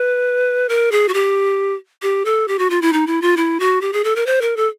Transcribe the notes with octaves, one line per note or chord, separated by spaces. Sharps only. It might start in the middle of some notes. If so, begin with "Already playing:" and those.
Already playing: B4
A#4
G#4
F#4
G4
G4
A4
G4
F#4
F4
E4
D#4
E4
F4
E4
F#4
G4
G#4
A4
A#4
C5
A#4
A4